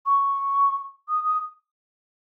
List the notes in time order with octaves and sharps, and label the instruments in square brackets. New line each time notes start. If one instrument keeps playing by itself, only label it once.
[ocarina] C#6
D#6
D#6